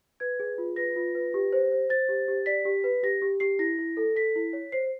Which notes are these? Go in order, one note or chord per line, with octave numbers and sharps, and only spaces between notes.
B4 G#6
G#4
F4
B4 A#6
F4
B4
G4
C5
C5
C5 A6
G4
G4
D5 B6
G4
B4
G4 A#6
G4
G4 C7
E4 A#6
E4
A4
A4 B6
E4
C#5
C5 C7